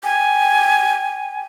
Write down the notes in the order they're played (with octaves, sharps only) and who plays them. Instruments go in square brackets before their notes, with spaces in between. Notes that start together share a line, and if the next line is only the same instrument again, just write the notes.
[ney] G5 [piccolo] G#5